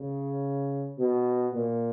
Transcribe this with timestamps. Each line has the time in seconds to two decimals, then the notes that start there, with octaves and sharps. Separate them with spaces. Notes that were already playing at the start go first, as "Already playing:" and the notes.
Already playing: C#3
0.99 B2
1.53 A#2